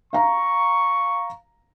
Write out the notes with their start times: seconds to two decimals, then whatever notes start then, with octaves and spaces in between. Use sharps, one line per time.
0.13 F5 A#5 C#6